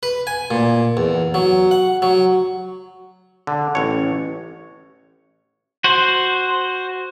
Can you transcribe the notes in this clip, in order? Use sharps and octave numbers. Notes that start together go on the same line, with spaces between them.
B4
G#5
A#2
E2
F#3
F#5
F#3
D3
A1 C#5
F#4 C5